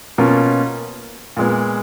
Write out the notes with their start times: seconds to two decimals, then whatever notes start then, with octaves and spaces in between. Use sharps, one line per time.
0.18 B2 A#3 C#4 F4
1.37 A#2 G#3 B3